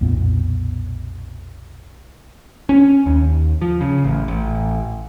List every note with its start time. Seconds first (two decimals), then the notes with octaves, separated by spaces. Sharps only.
0.01 B1 F2 A#2 B3
2.69 C#4
3.06 D#2
3.62 F3
3.81 C#3
4.04 A1
4.28 A1